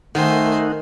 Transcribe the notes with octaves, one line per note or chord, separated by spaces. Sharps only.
D#3 A3 D#4 A#4 C5 F#5 G#5